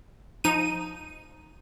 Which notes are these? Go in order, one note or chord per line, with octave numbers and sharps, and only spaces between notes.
F3 D#4 D#7